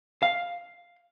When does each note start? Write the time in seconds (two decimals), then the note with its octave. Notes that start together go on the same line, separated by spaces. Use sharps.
0.23 F5